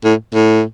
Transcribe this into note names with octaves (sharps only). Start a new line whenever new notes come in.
A2
A2